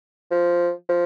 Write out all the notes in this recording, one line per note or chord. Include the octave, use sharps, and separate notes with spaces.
F3
F3